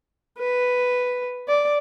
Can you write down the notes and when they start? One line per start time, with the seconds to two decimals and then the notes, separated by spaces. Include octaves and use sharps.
0.38 B4
1.49 D5